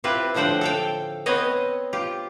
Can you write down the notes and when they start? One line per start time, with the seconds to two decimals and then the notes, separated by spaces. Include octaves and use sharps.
0.04 C4 E4 F4 G4 B4
0.34 A2 D3 F3 C5 F#5 G5
0.61 A4 F5 G5
1.26 B3 C4 B4 C#5 D#5
1.93 F4 G4